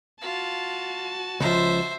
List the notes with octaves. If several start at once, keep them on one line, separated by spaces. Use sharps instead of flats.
F4 F#4 A5
C#2 F3 C5 E5